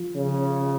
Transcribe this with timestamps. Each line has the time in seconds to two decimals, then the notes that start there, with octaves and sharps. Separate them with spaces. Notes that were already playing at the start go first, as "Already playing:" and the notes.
Already playing: F3 F4
0.16 C#3